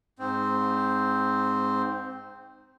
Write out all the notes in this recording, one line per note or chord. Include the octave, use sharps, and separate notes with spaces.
G#2 C4